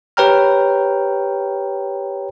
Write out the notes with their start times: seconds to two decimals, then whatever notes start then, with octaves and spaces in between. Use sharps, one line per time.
0.17 G4 B4 C#5 G5 A#5 F6